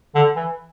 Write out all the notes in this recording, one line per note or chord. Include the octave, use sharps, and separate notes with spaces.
D3
E3